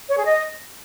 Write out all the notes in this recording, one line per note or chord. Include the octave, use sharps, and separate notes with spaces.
C#5
G#4
D#5